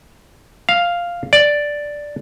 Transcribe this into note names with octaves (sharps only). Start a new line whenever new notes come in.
F5
D5